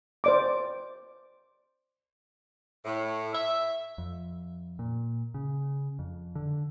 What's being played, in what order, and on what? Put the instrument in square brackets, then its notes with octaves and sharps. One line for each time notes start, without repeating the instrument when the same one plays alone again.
[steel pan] C5 D5 D6
[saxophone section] A2
E5
[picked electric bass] F2
A#2
C#3
F2
D3